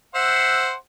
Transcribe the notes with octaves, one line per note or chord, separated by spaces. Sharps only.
C5 E5 F#5